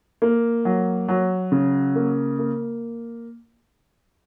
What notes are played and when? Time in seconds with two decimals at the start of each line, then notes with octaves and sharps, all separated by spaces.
0.22 A#3
0.65 F#3
1.08 F#3
1.52 C#3
1.95 A#3
2.39 A#3